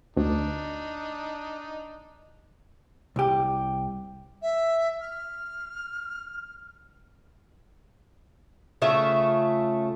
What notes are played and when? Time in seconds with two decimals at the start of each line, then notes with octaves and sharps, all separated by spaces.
0.17 D2 D4 D#4
3.16 C2 G4
4.42 E5
5.01 F6
8.82 C#3 A3 F4 E5